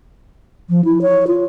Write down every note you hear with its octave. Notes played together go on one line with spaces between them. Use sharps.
F3
E4
C#5
F4